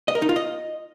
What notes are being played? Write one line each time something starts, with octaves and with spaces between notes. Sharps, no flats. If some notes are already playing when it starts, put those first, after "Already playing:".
D#5
A#4
D#4
F4
D#5